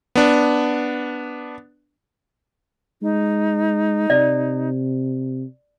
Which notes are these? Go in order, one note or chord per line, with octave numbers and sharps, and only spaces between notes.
B3 D4
G#3 D#4
C3 D5